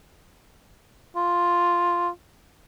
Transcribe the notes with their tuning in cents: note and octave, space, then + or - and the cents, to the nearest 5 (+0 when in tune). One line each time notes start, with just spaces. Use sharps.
F4 +0